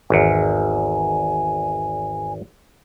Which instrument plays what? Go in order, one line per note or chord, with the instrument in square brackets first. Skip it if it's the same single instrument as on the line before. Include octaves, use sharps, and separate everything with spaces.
[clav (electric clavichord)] G#1 E2 [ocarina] G#5